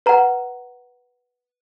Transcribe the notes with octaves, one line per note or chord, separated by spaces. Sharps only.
B4 F#5 A#5